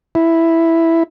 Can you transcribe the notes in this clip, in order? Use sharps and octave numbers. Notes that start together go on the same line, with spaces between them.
E4